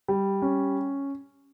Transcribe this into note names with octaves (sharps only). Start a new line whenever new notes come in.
G3
C#4